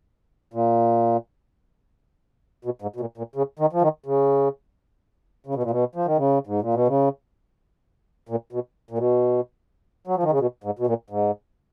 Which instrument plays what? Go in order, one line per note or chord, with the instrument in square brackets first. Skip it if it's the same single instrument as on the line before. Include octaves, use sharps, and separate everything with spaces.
[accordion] A#2
B2
G#2
B2
A#2
A#2
C#3
D#3
F3
D#3
C#3
C#3
B2
A#2
B2
F3
D#3
C#3
G#2
A#2
B2
C#3
A#2
B2
A#2
B2
F#3
F3
D#3
C#3
B2
G#2
B2
A#2
G#2